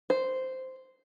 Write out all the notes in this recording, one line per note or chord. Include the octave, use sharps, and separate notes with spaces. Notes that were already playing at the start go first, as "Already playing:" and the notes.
C5